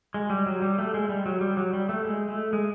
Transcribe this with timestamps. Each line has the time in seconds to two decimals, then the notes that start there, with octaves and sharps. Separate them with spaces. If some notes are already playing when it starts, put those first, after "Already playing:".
0.14 G#3
0.30 G3
0.46 F#3
0.62 G3
0.78 A3
0.94 G#3
1.09 G3
1.26 F#3
1.41 G3
1.57 F#3
1.73 G3
1.89 A3
2.05 G#3
2.29 A3
2.53 G#3